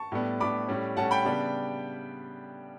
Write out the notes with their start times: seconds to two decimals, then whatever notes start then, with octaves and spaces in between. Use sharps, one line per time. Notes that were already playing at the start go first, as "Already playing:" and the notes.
Already playing: A5 C#6
0.12 A2 G3 B3 D4
0.40 A2 G3 B3 D4 B5 D6
0.68 A2 G3 C#4
0.97 A2 G3 C#4 F#5 A5
1.11 G5 B5
1.25 C#3 G3 B3 D4